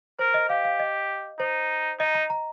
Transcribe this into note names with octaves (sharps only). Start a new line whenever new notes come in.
A#4 C5
D#5
G4 F5
F5
D#5
D#4 C5
D#4 D#5
A#5
A#5